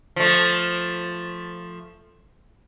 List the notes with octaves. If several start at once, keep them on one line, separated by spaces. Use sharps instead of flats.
F3 A3